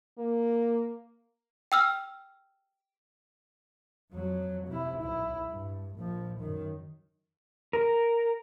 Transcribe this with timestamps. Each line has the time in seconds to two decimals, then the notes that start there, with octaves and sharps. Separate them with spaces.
0.19 A#3
1.72 G5 E6 F6
4.11 F2 F#3
4.67 C3 E4
5.02 B1 E4
5.49 G2
5.95 A#1 F3
6.40 F#2 D#3
7.73 A#4